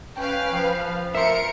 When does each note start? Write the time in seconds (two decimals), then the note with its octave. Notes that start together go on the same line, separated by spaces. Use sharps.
0.17 C#4 B4 F5 G5
0.53 F3
1.15 A#4 E5 C6 C#7 D7